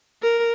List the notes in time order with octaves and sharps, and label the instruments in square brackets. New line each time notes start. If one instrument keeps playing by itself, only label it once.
[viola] A#4